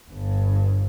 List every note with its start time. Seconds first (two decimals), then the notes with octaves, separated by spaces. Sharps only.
0.11 G1 G2